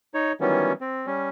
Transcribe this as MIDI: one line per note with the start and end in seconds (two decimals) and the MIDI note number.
0.14 0.32 63
0.14 0.32 73
0.41 0.73 51
0.41 0.73 52
0.41 0.73 54
0.41 0.73 55
0.41 0.73 59
0.41 0.73 61
0.81 1.06 60
1.06 1.30 55
1.06 1.30 61